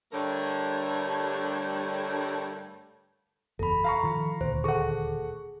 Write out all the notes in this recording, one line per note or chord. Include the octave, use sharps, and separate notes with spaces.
G2 D3 G3 A3 A#4 C#5
F#1 E2 A4 B5
F5 A#5 C#6
D#3 F3
D#1 D2 C5
G#4 A4 F#5 C#6